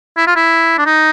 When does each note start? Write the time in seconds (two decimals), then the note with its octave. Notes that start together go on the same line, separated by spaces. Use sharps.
0.17 E4
0.27 F4
0.36 E4
0.78 D4
0.86 D#4